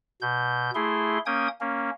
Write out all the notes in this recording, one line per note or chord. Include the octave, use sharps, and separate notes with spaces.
B2 G6
A3 E4 G#4 C6
A#3 C#4 G5 D#6 G#6
A#3 C#4